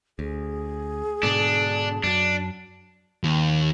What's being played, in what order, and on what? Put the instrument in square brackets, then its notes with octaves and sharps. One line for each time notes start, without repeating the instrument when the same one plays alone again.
[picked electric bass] D2 [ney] G#4
[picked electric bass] G#2 B2 D3 [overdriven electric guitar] D4
[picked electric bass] F#2 F#3 [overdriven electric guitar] D4
[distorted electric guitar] D#2